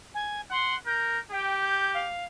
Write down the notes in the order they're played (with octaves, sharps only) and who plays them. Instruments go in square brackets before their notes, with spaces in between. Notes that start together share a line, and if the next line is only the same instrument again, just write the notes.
[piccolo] G#5
[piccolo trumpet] F#5 [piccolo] C6
[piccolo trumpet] A#4 [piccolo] G6
[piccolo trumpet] G4 [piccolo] G5
[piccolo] G6
F5